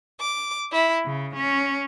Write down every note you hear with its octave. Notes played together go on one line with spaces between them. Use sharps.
D6
E4
C#3
C#4